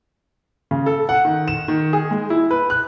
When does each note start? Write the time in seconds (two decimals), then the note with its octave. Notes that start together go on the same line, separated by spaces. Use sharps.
0.71 C#3
0.86 A4
1.09 F#5
1.25 D#3
1.48 E7
1.68 D#3
1.93 G#4
2.11 G#3
2.30 E4
2.51 B4
2.70 F#6